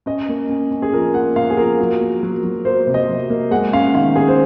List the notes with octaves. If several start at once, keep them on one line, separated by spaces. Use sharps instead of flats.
C#4 D#5
A#3
C#4
C#4
G#4
F3 A#4
A#3 F#5
A#3 F5
G#4
F3 A#4
F#3
A#3
F#3
F#3
A#3 C5
C3
D#5
F#3
A#3
G#3 F#5
C#4 F5
D#3 F5
C#4 G#4
C5